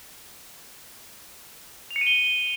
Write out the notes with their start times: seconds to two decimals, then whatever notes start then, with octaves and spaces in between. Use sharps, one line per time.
1.91 F7
1.96 C#7
2.01 D#7
2.07 G7